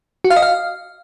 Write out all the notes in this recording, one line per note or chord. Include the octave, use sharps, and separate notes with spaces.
F#4
F5
D#5
F5